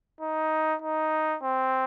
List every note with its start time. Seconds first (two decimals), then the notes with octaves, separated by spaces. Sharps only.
0.21 D#4
0.82 D#4
1.43 C4